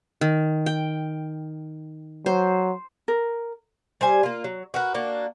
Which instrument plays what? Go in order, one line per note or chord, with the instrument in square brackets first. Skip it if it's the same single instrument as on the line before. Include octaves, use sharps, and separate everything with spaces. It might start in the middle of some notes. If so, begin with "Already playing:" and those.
[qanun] D#3
G5
[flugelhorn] F#3 [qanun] C5
[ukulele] A#4
[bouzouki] G3 C5 G#5
A#3 F4
F#3
F#4 A#4 B4
A#3 D4 F#4